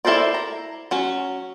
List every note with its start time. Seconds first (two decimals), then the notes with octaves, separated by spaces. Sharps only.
0.05 E4 A4 A#4 C5 D5
0.34 A#5
0.91 F#3 C#4